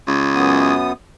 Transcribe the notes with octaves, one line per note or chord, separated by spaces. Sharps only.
C#2
F#2 B3 D#6